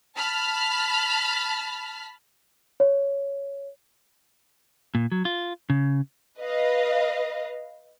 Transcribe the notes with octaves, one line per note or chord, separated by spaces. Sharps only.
A5 B5 F6
C#5
A#2
F#3
F4
C#3
B4 D#5 F5